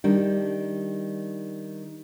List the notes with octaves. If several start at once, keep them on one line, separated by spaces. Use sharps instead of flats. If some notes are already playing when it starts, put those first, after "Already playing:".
D#3 G3 D4